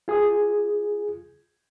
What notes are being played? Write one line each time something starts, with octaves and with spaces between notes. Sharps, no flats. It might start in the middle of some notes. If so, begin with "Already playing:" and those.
F4 G#4 G#5 D#6